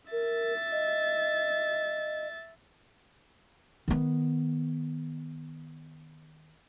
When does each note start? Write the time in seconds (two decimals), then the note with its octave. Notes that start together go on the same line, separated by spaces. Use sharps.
0.12 A#4 E5 A6
0.72 D#5
3.88 D#3 B3